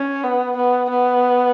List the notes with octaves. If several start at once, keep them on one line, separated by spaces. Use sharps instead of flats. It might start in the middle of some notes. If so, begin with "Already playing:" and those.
Already playing: C#4
B3
B3
B3